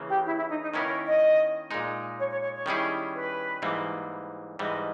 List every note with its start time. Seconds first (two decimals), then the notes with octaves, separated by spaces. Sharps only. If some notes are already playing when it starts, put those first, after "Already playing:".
Already playing: C#3 E3 A#3
0.09 G4
0.26 E4
0.37 E4
0.49 D#4
0.62 D#4
0.74 D#3 A#3 C#4 E4 A#4 B4
0.90 C#5
1.06 D#5
1.71 A#2 G#3 D#4
2.18 C#5
2.30 C#5
2.42 C#5
2.54 C#5
2.66 D#3 G3 C#4 E4 G#4
3.14 B4
3.62 G#2 E3 G3 A#3
4.59 G#2 E3 G3 D#5